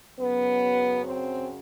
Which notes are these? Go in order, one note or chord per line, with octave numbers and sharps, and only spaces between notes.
F#2 C#3 F#3 B3
C4